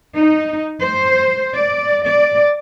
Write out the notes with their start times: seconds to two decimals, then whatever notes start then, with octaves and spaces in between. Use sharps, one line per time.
0.15 D#4
0.82 C5
1.55 D5
2.07 D5